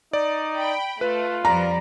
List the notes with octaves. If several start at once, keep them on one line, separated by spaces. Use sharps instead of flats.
D#4 D5
G5 B5
A3 F4 B4
F2 F3 G3 A#5